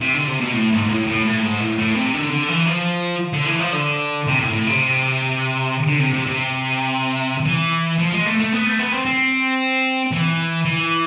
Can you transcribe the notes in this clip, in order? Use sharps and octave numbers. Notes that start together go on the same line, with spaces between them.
C3
D3
C3
B2
A2
G#2
G#2
A2
A2
A2
G#2
A2
A2
C3
D3
D3
E3
F3
D3
E3
F3
D3
C3
A2
A2
C3
D3
C3
C3
C3
E3
F3
G#3
A3
A3
B3
A3
B3
C4
C4
E3
E3